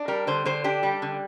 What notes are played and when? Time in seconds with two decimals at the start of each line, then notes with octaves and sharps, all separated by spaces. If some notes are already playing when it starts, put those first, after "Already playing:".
Already playing: D4
0.08 G3 A#4
0.27 D3 C5
0.45 D3 C5
0.64 D4 G4
0.83 G3
1.02 D3